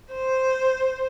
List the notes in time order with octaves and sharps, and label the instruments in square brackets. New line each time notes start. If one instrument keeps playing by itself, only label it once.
[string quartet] C5